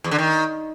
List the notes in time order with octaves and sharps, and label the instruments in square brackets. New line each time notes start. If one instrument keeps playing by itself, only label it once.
[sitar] E2
D3
D#3